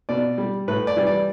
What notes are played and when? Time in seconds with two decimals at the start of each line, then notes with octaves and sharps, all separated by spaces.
0.09 B2 D5
0.38 G3
0.68 A2 B4
0.87 D5
0.97 E3 G3
1.07 D5